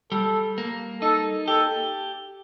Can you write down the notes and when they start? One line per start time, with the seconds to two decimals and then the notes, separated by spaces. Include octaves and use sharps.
0.12 G3 A4
0.58 A#3
1.02 D#4 A4
1.47 G4 A4